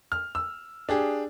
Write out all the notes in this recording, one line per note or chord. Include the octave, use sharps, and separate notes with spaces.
F6
E6
D4 G4 G#4